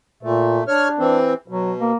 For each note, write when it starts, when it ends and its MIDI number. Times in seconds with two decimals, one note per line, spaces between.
0.23 0.60 46
0.23 0.64 57
0.68 1.17 62
0.68 0.88 73
0.68 0.88 89
0.99 1.34 52
0.99 1.34 60
1.48 1.92 47
1.48 1.73 54
1.80 1.96 58